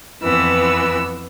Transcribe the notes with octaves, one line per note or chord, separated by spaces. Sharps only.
F2 E3 B3 E6